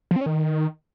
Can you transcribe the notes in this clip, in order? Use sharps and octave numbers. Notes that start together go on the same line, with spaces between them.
F3
C4
C#4
D#3